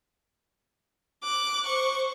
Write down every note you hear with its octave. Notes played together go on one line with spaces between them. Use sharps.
D6 F#6
C5 C#6